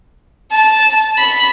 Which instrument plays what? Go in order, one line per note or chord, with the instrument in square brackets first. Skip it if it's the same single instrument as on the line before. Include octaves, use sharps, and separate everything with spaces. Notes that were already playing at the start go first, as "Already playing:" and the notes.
[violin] A5
B5